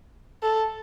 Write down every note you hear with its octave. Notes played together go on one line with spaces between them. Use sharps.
A4